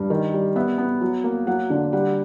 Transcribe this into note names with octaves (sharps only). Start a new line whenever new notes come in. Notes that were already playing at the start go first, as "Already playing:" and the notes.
Already playing: G2
D#3
G3
B3 E5
B3
F#3
A#3
F#3 F#5
D3
G3 F#5